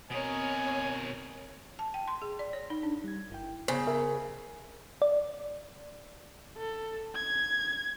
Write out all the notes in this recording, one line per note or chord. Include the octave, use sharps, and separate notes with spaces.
B2 C4 A#4 C#5 D#5 G#5 D#6
A5
G5
C6
G#4
D5
C#5
D#4
D4
G3 G#6
G1 E4 G5
C#3 B3 C5
A#4 E5
D5
A4
G#6